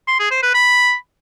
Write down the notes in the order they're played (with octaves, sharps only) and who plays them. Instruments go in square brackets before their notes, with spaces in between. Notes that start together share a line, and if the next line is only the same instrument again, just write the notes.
[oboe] C6
G#4
C5
B4
B5